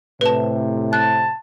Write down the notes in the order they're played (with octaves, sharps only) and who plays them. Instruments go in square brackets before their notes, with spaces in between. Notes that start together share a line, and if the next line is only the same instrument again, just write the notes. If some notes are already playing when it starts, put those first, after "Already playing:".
[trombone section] A2 C3 [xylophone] B4 A5
[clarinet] A5 [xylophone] F#6